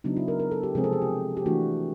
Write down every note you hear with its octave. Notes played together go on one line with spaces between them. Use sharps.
C#3 F#3 B3 D4 D#4
E4
A#4
A#4
A4
G4
C3 F3 G#3 C4 G#4
A4
G#4
G4
G4
E3 A3 D4 F#4